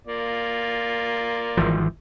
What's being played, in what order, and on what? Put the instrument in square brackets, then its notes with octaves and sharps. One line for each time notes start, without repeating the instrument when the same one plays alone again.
[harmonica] A#3 F4 D5
[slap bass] G#1 E3 F3